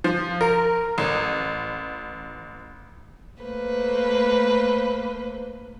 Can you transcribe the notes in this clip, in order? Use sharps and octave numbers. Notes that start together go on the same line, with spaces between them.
F3
A#4
A1
A3 A#3 B4 C5